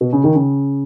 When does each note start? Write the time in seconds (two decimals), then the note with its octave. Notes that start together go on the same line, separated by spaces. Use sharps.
0.01 B2
0.13 C#3
0.24 D#3
0.35 C#3